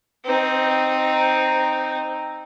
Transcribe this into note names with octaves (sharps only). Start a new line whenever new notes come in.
C4 D#4